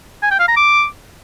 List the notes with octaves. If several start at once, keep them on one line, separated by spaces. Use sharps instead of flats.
G#5
G5
F5
A#5
D6